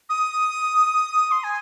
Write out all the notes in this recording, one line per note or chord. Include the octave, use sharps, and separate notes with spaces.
D#6
C6
G#5